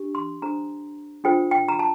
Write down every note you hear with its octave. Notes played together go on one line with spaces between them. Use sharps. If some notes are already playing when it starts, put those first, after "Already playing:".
Already playing: D4 G4
C6
D4 A4 C5 A#5
D4 F4 A4 C5 G5
G5
A#5
A5